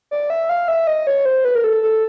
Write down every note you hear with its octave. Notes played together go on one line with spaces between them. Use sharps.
D5
E5
F5
E5
D#5
C#5
C5
B4
A#4
A4
A4